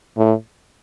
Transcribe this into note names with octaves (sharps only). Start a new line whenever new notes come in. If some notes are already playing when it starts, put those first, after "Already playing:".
A2